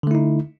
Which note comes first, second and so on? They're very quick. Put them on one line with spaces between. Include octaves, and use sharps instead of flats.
D3 A3 E4 D#4